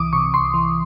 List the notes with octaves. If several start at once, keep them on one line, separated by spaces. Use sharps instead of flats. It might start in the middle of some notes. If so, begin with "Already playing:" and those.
Already playing: C2 E3 D6 D#6
C3 C#6
C2 C6
E3